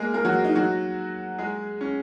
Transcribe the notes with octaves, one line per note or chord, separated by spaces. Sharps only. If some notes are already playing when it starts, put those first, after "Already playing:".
Already playing: G#3 A#3 G#4 A#4
A#3 A#4
F#3 F#4
D#4
F#3 F#4
G#3 G#4
C#4